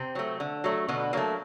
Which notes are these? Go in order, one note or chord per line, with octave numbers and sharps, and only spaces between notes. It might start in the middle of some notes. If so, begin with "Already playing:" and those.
Already playing: C3 C4
F#3 A3
D3
F#3 A3
B2 D3 B3
F#3 A3 A#3